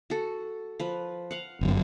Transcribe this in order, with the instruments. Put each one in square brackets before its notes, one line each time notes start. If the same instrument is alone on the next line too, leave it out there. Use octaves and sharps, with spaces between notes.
[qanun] F#4 A4
F3 B4
F5 F#5
[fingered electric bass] G1 F#2